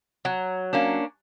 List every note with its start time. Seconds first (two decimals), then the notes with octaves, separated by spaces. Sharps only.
0.25 F#3
0.73 A#3 C#4 D4